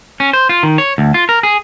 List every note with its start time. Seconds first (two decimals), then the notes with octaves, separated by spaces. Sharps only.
0.20 C#4
0.33 C5
0.49 F4
0.63 D#3
0.78 C#5
0.98 D2
1.14 F4
1.29 A#4
1.43 G#4